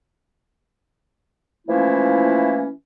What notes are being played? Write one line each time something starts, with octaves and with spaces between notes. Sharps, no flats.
E3 F3 A3 A#3 C#4 E4